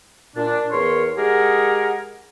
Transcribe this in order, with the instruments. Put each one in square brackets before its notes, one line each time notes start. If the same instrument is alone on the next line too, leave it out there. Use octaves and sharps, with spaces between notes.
[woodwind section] A#2 D4
E2 A#4 C#5 C6
G#3 G4 G#4 A#4 F#5